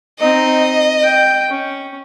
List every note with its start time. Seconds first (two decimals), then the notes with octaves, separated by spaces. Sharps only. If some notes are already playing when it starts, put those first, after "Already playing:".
0.20 C4 D#4 D#5
1.02 G5
1.49 C#4